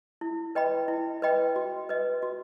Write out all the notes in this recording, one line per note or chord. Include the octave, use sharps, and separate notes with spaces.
E4
B4 D#5 G5 B5
E4
B4 D#5 G5 B5
F#4
B4 D#5
F#4